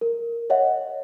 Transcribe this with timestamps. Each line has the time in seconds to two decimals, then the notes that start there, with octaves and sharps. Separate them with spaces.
0.01 A#4
0.50 C#5 D#5 E5 F#5